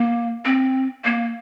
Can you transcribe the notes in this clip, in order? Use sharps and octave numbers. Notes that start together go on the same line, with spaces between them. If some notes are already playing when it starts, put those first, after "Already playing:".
Already playing: A#3
C4
A#3